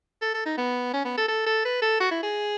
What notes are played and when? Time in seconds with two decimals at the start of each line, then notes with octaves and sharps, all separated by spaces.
0.22 A4
0.34 A4
0.46 D#4
0.58 B3
0.94 C#4
1.05 B3
1.18 A4
1.28 A4
1.46 A4
1.65 B4
1.82 A4
2.00 F#4
2.11 E4
2.23 G#4